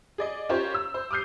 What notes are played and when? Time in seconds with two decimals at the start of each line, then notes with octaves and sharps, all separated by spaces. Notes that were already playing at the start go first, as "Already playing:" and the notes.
0.18 G#4 D5 D#5
0.49 C#4 F4 G4 A#4 C5 C#5
0.74 E6
0.94 C5
1.11 D6 D#6 F6 G6 C7